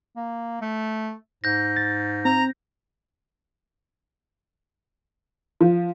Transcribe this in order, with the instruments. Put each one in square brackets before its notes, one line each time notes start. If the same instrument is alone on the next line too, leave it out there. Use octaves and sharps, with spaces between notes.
[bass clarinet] A#3
A3
[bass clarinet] G#2 [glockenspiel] G6 A#6
[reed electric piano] A6
[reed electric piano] C4 [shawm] A#5
[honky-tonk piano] F3